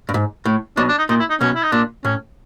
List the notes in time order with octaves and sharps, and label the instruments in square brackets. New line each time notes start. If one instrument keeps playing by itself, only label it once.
[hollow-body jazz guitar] G2
G#2
A2
[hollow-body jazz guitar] B1 B2 [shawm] D4
[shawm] D4
D#4
[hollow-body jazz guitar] A#2 [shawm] D#4
[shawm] E4
D#4
[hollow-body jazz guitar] B1 B2 [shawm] C#4
[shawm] E4
D#4
[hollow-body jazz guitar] A#2 [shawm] D4
[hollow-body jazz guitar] A2 [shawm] C#4